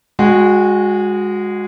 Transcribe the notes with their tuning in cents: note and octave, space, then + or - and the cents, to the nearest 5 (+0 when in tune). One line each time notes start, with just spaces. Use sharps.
G#3 -15 F#4 -20 F#5 +40